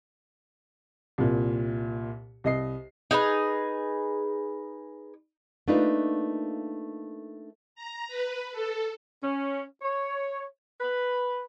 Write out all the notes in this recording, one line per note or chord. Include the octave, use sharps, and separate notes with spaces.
C2 A#2
C2 D#5 C7
D#4 G#4 A#4 B4
A3 A#3 D4 D#4 F4 B4
A#5
B4
A4
C#4
C#5
B4